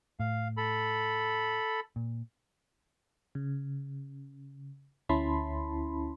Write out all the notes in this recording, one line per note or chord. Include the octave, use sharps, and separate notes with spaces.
A2 F5
A4 B5
A#2
C#3
D2 C#4 E4 A5 B5 C6